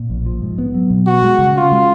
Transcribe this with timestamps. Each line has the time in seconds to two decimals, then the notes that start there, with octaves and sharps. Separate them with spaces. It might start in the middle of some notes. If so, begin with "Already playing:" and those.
Already playing: A#2
0.10 A#1
0.26 F3
0.42 G#2
0.58 B3
0.74 F#3
0.91 B2
1.07 B3 F#4
1.23 G#3
1.39 C#3
1.56 C#4 F4
1.72 G#3